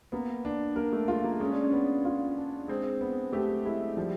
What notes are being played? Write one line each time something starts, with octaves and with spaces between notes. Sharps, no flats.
A#3 B3
D4
A#3 A#4
A3
G#3 F4
A#3
G#3 C#4
D4
C#4
B3
F4
D4
G#3 C4
B3
A3 G4
G#3 E4
F3 G3